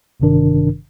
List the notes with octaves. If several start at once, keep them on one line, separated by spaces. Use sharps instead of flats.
G#1 G2 C3 D#3 D4 A#4